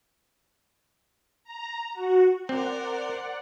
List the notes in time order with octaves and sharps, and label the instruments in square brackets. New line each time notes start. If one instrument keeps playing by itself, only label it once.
[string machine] A#5
F#4
[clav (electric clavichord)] C4 [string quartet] A#4 C5 [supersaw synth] D5 F#5